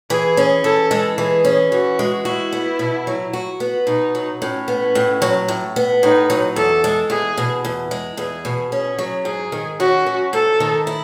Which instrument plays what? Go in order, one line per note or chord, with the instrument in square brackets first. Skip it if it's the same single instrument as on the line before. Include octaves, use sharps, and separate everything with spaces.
[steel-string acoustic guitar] E3 [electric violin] G#4
[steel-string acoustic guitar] C#4
[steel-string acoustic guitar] E3 [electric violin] A4
[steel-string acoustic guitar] G#3
[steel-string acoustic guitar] E3 [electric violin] G#4
[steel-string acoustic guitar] C#4
[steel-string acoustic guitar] E3 [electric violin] F#4
[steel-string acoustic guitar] G#3
[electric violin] E4 [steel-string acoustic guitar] F#4
[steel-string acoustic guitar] B3
B2
F#3
F#4
B3
[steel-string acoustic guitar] B2 [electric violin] D#4
[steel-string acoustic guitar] F#3
[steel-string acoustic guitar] A2 [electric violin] C#4
[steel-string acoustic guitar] B3
A2
F#3
A2
B3
[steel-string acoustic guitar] A2 [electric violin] D#4
[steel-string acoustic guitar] F#3
[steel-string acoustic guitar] E2 [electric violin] A4
[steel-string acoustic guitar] G#3
[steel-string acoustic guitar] E2 [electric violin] G#4
[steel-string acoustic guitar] B2
E2
G#3
[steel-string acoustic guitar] E2 [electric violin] G#4
[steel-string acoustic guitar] B2
[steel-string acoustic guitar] C#4 [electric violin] G#4
[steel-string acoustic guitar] F#3
[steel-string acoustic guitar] G#2 [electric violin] G#4
[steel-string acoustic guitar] D#3
[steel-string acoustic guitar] C#4 [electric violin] F#4
[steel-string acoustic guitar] F#3
[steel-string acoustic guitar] G#2 [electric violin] A4
[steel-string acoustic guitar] D#3
E4